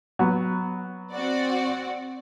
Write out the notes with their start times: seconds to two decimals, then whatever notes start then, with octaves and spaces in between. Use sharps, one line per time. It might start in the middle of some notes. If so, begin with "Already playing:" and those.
0.19 F#3 B3
1.12 C4 F#4 D5